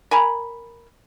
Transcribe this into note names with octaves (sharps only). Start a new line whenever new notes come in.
A#4 G#5 B5